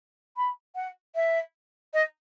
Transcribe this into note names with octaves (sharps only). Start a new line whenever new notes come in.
B5
F#5
E5
D#5